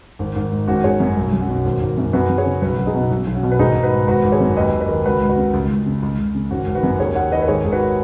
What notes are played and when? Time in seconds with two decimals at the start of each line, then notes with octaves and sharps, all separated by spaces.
0.19 G#1
0.36 G#1
0.51 G#2
0.68 G#1 C#4 F#4
0.84 G#1 G#4 C#5
1.00 F#2
1.17 B1
1.33 B1
1.40 C#4 F#4
1.49 B2
1.65 G#1
1.81 G#1
1.97 F#2
2.13 F#2 F#4 B4
2.30 F#2
2.38 G#4 C#5
2.46 C#3
2.62 B1 F#4 B4
2.76 B1 F#4
2.86 D#4 G#4
2.94 B2
3.10 B1
3.27 B1
3.35 C#4 F#4
3.43 B2
3.52 B4
3.59 G#1 D#4 G#4
3.76 G#1
3.83 F#4 B4
3.92 G#2
4.08 G#1 F#4 B4
4.24 G#1
4.32 G#4 C#5
4.40 F#2
4.57 D#2 B4 D#5
4.73 D#2
4.81 B4 D#5
4.89 D#3
5.05 C#2 F#4 B4
5.22 C#2
5.29 F#4 B4
5.37 C#3
5.53 C#2
5.70 C#2
5.86 C#3
6.02 C#2
6.19 C#2
6.35 C#3
6.51 G#1 C#4 F#4
6.67 G#1
6.75 F#4 B4
6.83 F#2
6.99 D#2 G#4 C#5
7.15 D#2 C#5 F#5
7.32 D#3 B4 D#5
7.42 B4
7.48 G#1 G#4 C#5
7.64 G#1 G#4
7.72 F#4 B4